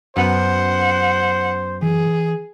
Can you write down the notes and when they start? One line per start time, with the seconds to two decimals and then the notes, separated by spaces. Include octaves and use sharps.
0.17 F#2 B3 B4 C5 F#5
1.82 E3 G#4